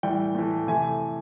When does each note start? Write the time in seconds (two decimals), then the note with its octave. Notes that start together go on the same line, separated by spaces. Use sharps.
0.03 A2 E3 G3 G5
0.35 A2 E3 A3
0.67 C3 E3 A3 G#5